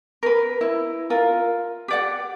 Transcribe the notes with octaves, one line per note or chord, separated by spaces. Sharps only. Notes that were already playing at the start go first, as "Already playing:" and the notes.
A#4 B4
E4
F4 A#4
G4 D5 F#5